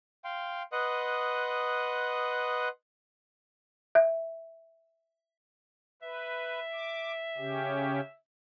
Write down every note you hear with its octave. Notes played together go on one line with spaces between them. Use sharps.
F5 G5 C6
B4 D#5 F#5 C6 D#6 F#6
E5
B4 E5
D6
C#3 C#4 G4